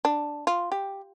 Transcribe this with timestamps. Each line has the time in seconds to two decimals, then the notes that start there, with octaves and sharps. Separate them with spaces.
0.05 D4
0.47 F4
0.72 G4